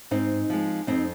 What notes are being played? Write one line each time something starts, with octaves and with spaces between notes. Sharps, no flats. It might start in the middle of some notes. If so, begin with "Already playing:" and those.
G#2 C4 D#4
F3 G#3
F2 C4 D#4